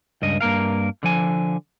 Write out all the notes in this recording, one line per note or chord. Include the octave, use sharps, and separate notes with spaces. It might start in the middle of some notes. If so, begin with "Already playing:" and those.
C#2 G2 D#5
G2 A#3 A#4 F5
D3 F3 G#5